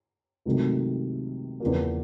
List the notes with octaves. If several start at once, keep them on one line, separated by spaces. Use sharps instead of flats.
C#2 C3 D#3 F#3 A3
E2 C#3 F3 A#3